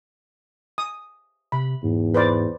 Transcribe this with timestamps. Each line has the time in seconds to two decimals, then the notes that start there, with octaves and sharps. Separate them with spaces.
0.78 D#6
1.52 C3 B5
1.83 E2 G#2
2.14 B4 C5 D5